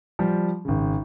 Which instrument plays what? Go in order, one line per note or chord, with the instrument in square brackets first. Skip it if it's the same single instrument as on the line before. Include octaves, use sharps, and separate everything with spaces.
[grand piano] F3 G3
G#1 C#3